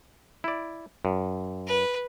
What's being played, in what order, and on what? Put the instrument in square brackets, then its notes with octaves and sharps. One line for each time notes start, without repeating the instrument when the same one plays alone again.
[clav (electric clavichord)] E4 D5
F#2
[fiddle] B4